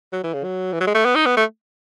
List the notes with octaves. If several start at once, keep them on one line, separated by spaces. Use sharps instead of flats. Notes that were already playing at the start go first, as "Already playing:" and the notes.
F#3
E3
C#3
F#3
E3
F#3
G#3
A3
B3
D#4
B3
A3